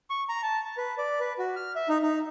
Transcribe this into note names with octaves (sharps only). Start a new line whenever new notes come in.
C#6
A#5
A5
A5
B4
D5
B4
F#4
F6
E5
D#4
D#4